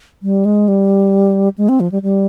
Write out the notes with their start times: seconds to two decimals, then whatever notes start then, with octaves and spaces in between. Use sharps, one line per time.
0.23 G3
0.45 G#3
0.68 G3
1.58 G#3
1.69 C4
1.80 F3
1.92 G3
2.03 G3